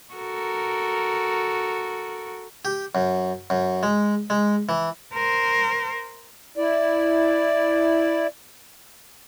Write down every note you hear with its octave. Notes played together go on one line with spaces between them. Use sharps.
F#4 A4 A#4
G4
F#2
F#2
G#3
G#3
E3
A#4 C5
E4 D5